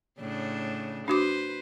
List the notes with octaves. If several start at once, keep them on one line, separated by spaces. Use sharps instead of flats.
A2 C#3 D4
D4 F#4 B4 C5 D6